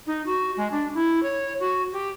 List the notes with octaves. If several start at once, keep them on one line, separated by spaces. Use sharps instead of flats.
D#4
F#4
G#3
D4
E4
C#5
F#4
G4